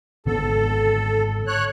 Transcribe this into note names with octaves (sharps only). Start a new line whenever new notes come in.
G#1 D3 B3 A4
C#5 F#6